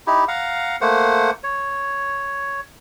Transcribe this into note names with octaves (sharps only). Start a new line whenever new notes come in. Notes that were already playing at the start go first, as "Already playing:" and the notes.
D#4 E4 G4
F5 F#5 A#5
A3 A#3 C5 F#5
C#5